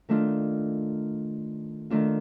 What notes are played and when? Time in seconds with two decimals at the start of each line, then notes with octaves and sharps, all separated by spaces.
0.09 D#3 A3 D4 F4
1.90 D#3 A3 D4 F4